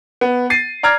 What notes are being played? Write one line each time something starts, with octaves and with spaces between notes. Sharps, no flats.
B3
A6 C7 D#7
D5 A#5 F6 G#6